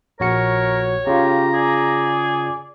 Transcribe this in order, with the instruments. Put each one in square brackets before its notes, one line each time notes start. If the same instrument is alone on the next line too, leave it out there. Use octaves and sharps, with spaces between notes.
[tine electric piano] A#1 F#4 C#7 [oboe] A#4 [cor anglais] C#5
[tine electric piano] C#3 F4 [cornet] G4 [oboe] A#5
[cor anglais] G#4 [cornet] D5